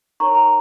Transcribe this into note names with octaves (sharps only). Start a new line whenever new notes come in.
D#4 A#4 C#5 A#5 C#6
A#5 C#6